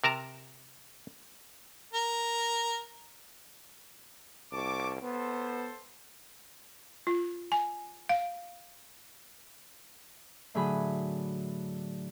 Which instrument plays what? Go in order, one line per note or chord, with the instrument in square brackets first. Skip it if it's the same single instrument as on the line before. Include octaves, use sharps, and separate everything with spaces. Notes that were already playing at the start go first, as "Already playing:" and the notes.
[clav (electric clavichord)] C3 A#4 A5 A#5
[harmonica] A#4
[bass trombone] C2 [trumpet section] A5 C#6 D6
[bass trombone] B3 [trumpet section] A4 C5
[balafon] F4
G#5
F5
[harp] A2 D3 F#3 G#4 G#5 B5